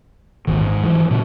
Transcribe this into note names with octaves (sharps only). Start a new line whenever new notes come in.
D#1 G#1 D#3
G#2
E3 F#3
A#2 C#3